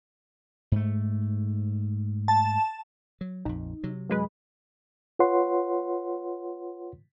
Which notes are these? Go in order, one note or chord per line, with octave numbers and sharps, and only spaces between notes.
G#2 A3
A5
F#3
A#1 F2 D#4
C3 F#3
F#2 G#3 B4
F4 B4 C#5 F#5 C6